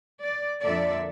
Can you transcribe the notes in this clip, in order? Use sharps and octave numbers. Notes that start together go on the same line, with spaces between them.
D5
F2 A#2 D3 A4 D5 E5